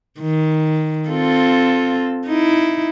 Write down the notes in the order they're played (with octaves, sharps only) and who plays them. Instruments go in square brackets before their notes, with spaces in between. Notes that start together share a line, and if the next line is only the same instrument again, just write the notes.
[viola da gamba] D#3
C4 F4 A4
D#4 E4